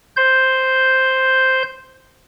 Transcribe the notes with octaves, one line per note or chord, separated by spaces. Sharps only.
C5 G6